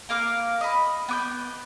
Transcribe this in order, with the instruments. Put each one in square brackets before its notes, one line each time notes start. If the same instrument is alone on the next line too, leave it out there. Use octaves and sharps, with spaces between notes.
[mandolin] A#3 A#4 F5 D6
D#5 B5
B3 D6 G6